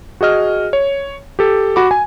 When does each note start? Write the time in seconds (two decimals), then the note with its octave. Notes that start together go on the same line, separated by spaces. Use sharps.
0.21 F#4 G#4 D#5 F6
0.73 C#5
1.39 G4 A4
1.76 F#4 B5 D6
1.91 G#5